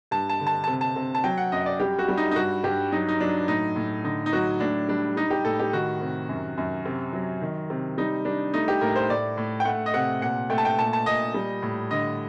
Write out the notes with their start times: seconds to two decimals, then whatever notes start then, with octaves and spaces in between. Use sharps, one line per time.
0.11 G2 A5
0.29 A5
0.40 D3
0.47 A5
0.64 A5
0.67 C3
0.81 A5
0.96 C3
1.15 A5
1.24 F#3 G5
1.38 F#5
1.52 F#2 D#5
1.66 D5
1.80 G3 G4
1.99 F#4
2.08 G3
2.17 D#4
2.31 D#4
2.36 G2 F#4
2.64 G2 G4
2.92 F#3 D#4
3.08 D#4
3.20 F#3 D4
3.48 A2 D#4
3.76 A2
4.04 D3 D#4
4.26 D#4
4.33 F#3 F#4
4.60 A2 D4
4.89 G3 D4
5.16 G3 D#4
5.30 G4
5.45 A2 A4
5.59 G4
5.73 D#3 F#4
6.01 C3
6.29 F#2
6.58 F#2
6.85 C3
7.13 F#3
7.41 D#3
7.70 C3
7.98 G3 D#4
8.25 G3 D4
8.54 A3 D#4
8.68 G4
8.81 A2 A#4
8.96 C5
9.09 A2 D5
9.37 A2
9.60 G5
9.65 A3 F#5
9.86 D#5
9.94 C3 F#5
10.21 A#2 F#5
10.50 A3 G5
10.58 A5
10.65 G5
10.78 A#2 A5
10.93 A5
11.06 A#2 D#5
11.34 G3
11.62 A2
11.91 D3 D#5